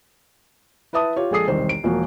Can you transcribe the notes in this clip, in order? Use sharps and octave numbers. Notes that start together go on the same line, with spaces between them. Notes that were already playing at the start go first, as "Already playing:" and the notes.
E4 B4 E5 A5 D#6
F4 G4 C#5
A#1 G#3 G#4 A4 D#6 C7
E1 C2 D#3 C5
D7
E1 F3 A#3 F#4